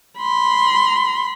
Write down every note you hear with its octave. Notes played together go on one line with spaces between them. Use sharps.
B5 C6